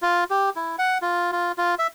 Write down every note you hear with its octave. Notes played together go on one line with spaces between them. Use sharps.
F4
G4
E4
F#5
F4
F4
F4
E5